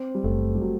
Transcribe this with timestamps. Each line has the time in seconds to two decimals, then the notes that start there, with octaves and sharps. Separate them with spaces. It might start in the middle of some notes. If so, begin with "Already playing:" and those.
Already playing: C4
0.15 G3
0.24 F#1 A3
0.55 G3
0.61 F#3